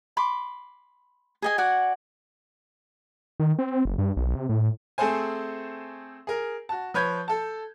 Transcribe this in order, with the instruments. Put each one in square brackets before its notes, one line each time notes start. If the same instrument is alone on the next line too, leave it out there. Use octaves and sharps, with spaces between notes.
[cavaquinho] B5 C6 D6
G#4 D#5 G#5
F#4 D5 F#5 G#5
[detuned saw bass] D#3
C4
F#1
G2
B1
C3
A2
[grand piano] A3 C4 G#4 A4 C5 G#5
G#4 A#4
F#4 A5
F3 B4 C#5 G6 G#6
A4 A5